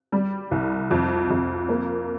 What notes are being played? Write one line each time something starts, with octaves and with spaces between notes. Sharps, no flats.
G3
C2
F2
F2
A#3